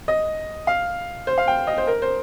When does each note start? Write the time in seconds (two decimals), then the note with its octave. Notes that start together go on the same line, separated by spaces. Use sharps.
0.08 D#5
0.67 F5
1.27 C5
1.38 F5
1.48 G5
1.67 D#5
1.78 C5
1.87 A#4
2.02 C5